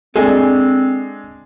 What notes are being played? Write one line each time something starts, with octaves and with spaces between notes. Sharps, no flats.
G#3 C4 D4 A4 D#5 G#5